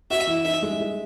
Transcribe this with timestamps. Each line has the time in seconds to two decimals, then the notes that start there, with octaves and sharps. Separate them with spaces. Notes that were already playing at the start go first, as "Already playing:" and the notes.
0.10 F#4 E5
0.27 E3
0.45 D#4 E5
0.62 G#3
0.80 G#3